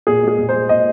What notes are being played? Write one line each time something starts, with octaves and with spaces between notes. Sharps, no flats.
A#2 G#4
G#3 G#4
A#2
C5
G#3
A#2 D#5